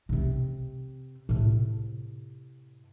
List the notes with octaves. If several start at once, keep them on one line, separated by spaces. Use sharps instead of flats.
C3 C4
A2 C3